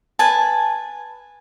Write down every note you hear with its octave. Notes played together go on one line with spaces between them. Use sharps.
B4 G#5 A5